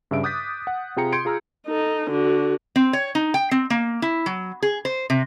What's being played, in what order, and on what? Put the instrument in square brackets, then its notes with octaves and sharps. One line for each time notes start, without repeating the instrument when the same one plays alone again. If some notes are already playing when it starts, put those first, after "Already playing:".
[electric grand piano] G2 C#3 E5 D7
D6 D#6 F#6 G6 A6 B6
F#5
C3 F4 G#4 G5 A#5 C#7
C6 G6 G#6 C#7 D7
F4 G#4 A#5 E6 F6
[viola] D#4 A4
D3 F#4
[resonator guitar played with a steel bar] C4
C#5
D#4
G5
C4
A#3
E4
F#3
G#4
C5
C3